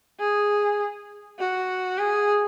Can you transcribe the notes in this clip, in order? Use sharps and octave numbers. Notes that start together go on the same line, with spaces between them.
G#4
F#4
G#4